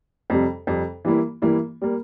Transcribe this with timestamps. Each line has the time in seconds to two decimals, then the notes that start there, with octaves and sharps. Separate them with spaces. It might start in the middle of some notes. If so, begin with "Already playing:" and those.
0.30 F2 C3 G3
0.67 F2 C3 G3
1.05 E3 G3 A#3 E4
1.42 E3 G3 A#3 E4
1.82 G3 A#3